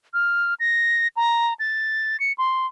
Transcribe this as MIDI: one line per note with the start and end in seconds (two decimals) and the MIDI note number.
0.14 0.54 89
0.60 1.07 94
1.17 1.54 82
1.59 2.19 93
2.20 2.32 97
2.38 2.67 84